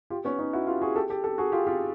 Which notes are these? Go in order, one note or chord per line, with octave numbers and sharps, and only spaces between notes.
F4 G4
B3 C#4
C#4 D#4
E4 F#4
F4 G4
F#4 G#4
G4 A4
G4 A4
G4 A4
F#4 G#4
F4 G4
F4 G4